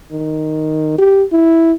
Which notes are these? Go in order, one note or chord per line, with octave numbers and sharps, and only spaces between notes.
D#3
G4
E4